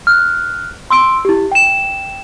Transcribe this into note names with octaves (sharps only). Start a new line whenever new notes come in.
F6 F#6
C6 E6 D7
E4 G4
G5 E7